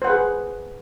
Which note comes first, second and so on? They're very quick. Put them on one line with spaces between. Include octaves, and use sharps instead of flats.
C5 F#5 B4 G#4